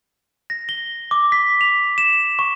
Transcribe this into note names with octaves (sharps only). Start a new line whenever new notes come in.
A#6
G7
D6
B6
F7
E7
C#6